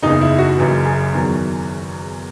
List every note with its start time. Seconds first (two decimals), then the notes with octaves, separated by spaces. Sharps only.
0.03 F#1 E2 C#3 D#4
0.21 E4
0.39 F#4
0.58 F#1 F#2 E3
0.86 G#4
1.13 E2 D#3 F#3